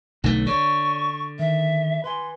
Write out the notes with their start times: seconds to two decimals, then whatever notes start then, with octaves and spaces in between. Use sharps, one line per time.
0.24 B1 D3 A3 D#4
0.47 D3 D4 C#5 C#6
1.39 D#3 E5
2.04 B4 G#5 C6